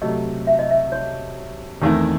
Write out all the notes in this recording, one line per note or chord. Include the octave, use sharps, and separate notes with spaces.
C3 F#3 A3 D#5
E5
D#5
E5
C#5
E2 D#3 A3 C4 E4